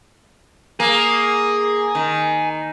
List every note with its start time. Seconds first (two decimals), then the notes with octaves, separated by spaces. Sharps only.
0.80 A#3 G#4
1.95 D#3